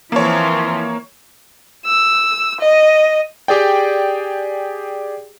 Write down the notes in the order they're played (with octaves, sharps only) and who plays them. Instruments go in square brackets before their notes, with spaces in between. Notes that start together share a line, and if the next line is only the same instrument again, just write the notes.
[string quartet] E3 F3 C4 [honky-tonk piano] A#3 C#5
[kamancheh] E6
D#5
[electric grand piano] G4 G#4 D5 G5